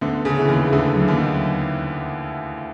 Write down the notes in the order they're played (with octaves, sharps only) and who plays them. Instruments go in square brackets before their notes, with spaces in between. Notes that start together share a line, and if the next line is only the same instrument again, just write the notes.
[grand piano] D2 D3 [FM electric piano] B3
[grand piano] C#3 [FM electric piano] G#4
[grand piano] E3
[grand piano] D#2 D#3 [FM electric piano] G#4
[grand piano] D2 D3 [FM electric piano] G#4
[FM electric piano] F#3
[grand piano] D#2 D#3
[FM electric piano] D#4